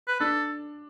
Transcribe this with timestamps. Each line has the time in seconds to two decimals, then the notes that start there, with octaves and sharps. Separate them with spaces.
0.08 B4
0.20 D4 A4